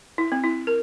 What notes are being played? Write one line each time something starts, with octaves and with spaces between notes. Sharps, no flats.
E4
C4
E4
A#4